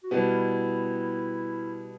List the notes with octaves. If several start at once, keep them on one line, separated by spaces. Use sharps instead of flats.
F#4
B2 G3 B3 E4